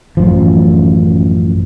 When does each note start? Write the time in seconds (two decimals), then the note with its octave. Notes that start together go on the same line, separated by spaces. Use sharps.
0.17 A1 F#2 F3